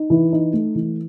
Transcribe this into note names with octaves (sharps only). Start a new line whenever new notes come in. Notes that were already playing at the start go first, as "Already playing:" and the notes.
Already playing: D#4
E3
D#4
A3
E3